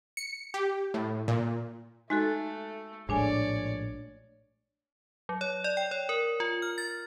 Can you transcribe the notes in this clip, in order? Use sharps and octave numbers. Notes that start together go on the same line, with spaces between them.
C#7
G4
A2
A#2
G#3 A3 D#4 F#4 A4
A#1 A2 G#3 A3 D4 C#5 D5 G#5
F#3
C#5
D5
G5
C#5
A#4
F4
F6
A6